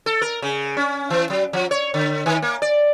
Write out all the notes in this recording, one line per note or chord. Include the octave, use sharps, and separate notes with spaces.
A4
A#4
C#3
C#4
E3
F#3
F3
C#5
D3
D#3
A#3
D5